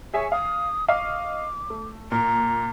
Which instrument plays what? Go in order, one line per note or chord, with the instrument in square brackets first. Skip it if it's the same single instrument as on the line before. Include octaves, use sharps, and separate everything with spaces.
[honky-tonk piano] G#4 E5 G#5 [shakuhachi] C#5
[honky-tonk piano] F5 [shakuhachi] D#6
[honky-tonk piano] D#5 F5 C#6 [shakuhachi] D6
[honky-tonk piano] A3
[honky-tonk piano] A#2 [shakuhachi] A#5